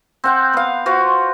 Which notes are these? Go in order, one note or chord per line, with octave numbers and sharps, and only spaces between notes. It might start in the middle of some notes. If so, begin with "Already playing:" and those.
C4 F#5 G5
B3 F5
F4 F#4 C5 C#6